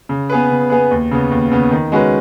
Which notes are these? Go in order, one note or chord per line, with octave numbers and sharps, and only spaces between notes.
C#3
B3 G#4 B4
C#3
B3 G#4 B4
D#2
C#3 B3
D#2
C#3 B3
D#3
G#3 C#4 F#4 B4